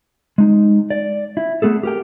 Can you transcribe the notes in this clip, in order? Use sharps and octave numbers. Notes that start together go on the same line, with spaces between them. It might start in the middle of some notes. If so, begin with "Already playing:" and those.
G#3 D#4
D5
E4
A3 B3 G#4 A4
G4 A#4 G5